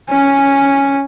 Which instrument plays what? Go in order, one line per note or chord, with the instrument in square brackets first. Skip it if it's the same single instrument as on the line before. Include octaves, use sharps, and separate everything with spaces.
[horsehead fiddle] C#4 G#5